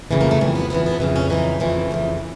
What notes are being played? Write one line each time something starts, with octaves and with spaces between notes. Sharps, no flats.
F2 C#3 E3 B3
A#3
A3
F2 C#3 E3 G3
B3
F2 C#3 E3 B3
B3
F2 C#3 E3
C#4
F2 C#3 E3 D#4
F2 C#3 E3 A3
F2 C#3 E3